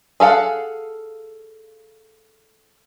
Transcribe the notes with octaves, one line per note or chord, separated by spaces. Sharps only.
G#4 A4 F5 F#5